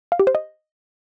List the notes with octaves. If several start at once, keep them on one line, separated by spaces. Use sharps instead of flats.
F5
G4
C5
D#5